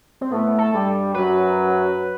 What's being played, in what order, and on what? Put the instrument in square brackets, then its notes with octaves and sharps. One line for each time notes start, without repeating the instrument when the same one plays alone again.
[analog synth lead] C4
[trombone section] A2 A3 [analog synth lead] B3
[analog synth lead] A4
[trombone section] G2 G3
[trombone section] F#2 F#3 [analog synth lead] B4